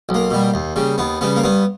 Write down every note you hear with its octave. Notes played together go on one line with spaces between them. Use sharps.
B1
A#3
B2 G3
D#2
C#3 G3
D#2 B3
C#3 G3 B3
A#3
G2 B3